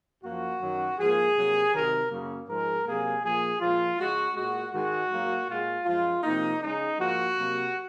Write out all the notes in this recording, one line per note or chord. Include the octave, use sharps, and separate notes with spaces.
F#2 F3 A#3 F#4
F#2 D#3 F#3
G#2 F3 A#3 G#4
C3 F#3 A#3
C3 D#3 F#3 A#4
F#2 C#3 F#3 A#3
G#2 F3 G#3 A#4
C3 F#3 A#3 G#4
A#2 F3 A#3 G#4
A#2 F3 G#3 F4
C#3 G#3 F#4
A#2 G#3 F#4
G#2 D#3 G#3 F#4
G#2 F#3 A#3
A#2 G#3 F4
F#2 F3 G#3 F4
C3 F3 A#3 D#4
C#3 G#3 D#4
G#2 F3 A#3 F#4
C3 F#3 A#3